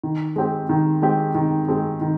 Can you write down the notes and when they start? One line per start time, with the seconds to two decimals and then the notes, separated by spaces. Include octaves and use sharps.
0.04 D#3
0.36 G#3 C4 G4
0.69 D#3
1.02 G#3 C4 G4
1.35 D#3
1.68 G#3 C4 G4
2.01 D#3